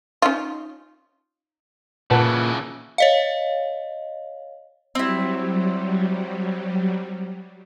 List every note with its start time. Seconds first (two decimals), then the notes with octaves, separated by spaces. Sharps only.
0.22 C#4 D#4 F4
2.11 A#2 C#3 E3 B4 F#5 A5
2.98 C#5 D#5 F5
4.95 F#3 G3 C4 E4